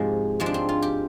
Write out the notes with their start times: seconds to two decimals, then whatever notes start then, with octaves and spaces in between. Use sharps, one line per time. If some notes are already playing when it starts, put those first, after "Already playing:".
Already playing: G#2 C3 F3 G#3
0.40 G#2 F3 G#3
0.46 D4
0.54 C4
0.69 F4
0.82 G4